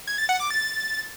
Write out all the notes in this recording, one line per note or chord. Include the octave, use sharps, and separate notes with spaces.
G#6
A6
F#5
D6
A6